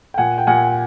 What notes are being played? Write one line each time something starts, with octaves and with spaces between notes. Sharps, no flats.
G5
A#2 F#5 G#5
G5
A#2 F#5 G#5